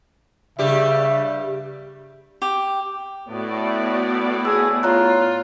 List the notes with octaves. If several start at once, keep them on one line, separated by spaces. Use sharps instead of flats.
G2 C#3 G3 G4 E5
G4
A2 B3 F#4 D5
G#4 E6
F4 C#5 A#5 F#6